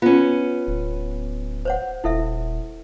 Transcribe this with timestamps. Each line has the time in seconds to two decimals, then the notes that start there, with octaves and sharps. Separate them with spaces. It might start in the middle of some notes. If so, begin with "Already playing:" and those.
0.02 B3 C#4 F4
0.67 D1
1.65 C5 C#5 F#5
2.04 D#1 E4 A4 E5